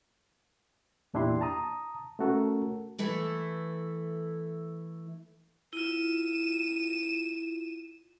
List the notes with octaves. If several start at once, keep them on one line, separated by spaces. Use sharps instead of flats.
E2 A#2 D4 E4 G4 C6
A5 A#5 D#6
A3 C#4 F#4 A4 A#4
E3 A3 E4 A4
E4 F4 D#7 E7